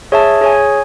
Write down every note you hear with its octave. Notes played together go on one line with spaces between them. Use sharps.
G#4 C#5 E5 A5
G#4 C#5 G#5